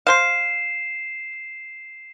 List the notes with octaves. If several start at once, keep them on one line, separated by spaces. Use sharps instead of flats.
C5 F5 C7 E7